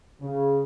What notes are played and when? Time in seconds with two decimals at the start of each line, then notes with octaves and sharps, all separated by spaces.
0.21 C#3